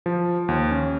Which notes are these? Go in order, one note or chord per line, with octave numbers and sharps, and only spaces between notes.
F3
D#2
C#4